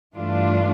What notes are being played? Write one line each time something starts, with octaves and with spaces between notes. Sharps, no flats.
G2 E3 A3 D4 F4